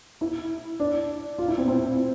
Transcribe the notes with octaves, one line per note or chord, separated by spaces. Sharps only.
E4
D4
F4
E4
C4
C4